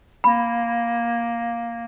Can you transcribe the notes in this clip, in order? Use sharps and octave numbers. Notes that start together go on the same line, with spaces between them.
A#3 B5